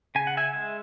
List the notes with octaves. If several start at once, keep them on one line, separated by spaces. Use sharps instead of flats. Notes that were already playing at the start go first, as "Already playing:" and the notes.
C#3 G#5
F#5
E5 G#5
G#3